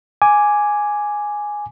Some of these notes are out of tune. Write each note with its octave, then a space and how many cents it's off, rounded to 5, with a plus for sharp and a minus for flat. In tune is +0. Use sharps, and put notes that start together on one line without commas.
G#5 +0 D6 +0